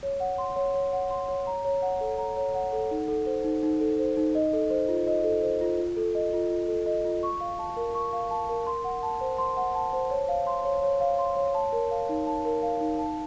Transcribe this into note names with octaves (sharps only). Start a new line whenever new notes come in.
C#5
F#5
C6
C#5
C#5
F#5
C6
C#5
A#5
C#5
F#5
A4
A#5
C#5
F#5
A4
D#4
A4
C5
D#4
D#4
A4
C5
D#4
D#5
A4
C5
F4
D#5
A4
C5
F4
F4
A4
D#5
F4
F4
A4
D#5
F4
C#6
F5
A5
A#4
C#6
F5
A5
A#4
C6
F#5
A5
C5
C6
F#5
A5
C5
C#5
F5
C6
C#5
C#5
F5
C6
C#5
A5
A#4
F5
D#4
A5
A#4
F5
D#4
A5